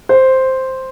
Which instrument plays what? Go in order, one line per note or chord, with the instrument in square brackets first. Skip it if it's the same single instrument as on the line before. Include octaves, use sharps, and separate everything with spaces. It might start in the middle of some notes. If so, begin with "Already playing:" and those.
[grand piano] C5